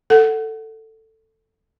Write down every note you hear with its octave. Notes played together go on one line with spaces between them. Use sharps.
A4 F#5